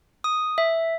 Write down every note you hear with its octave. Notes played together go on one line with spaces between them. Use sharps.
D#6
E5